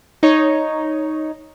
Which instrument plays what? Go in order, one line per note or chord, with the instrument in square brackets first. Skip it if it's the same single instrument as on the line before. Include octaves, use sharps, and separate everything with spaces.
[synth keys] D#4 C#5